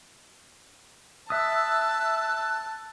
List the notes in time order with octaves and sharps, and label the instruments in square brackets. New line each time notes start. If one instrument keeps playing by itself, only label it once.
[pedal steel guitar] E5 D#6 [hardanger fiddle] A5 [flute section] E6 F#6